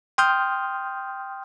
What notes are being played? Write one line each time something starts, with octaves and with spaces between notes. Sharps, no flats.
G5 C6 D#6 F6 G6